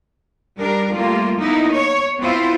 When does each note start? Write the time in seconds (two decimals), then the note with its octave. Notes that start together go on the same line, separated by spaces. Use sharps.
0.58 G3 D4 A#4
0.94 G3 A3 A#3 F4
1.40 A#3 B3 D#4 E4
1.73 C#5
2.20 B3 C4 E4 F4 C5